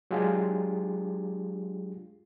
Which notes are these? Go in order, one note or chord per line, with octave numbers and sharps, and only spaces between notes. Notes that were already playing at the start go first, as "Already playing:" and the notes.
F#3 G#3 D4 F4 G4 G#4